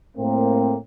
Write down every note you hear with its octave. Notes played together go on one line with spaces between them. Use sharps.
A2 A#3 C4